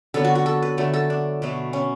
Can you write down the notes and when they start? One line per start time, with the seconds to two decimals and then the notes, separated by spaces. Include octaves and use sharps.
0.14 D3 F#3 B3 A4
0.24 F#4
0.35 F#4
0.46 A4
0.62 B4
0.77 D3 F#3 A3 A4
0.94 A4
1.10 D4
1.42 B2 F#3 A3
1.73 C#4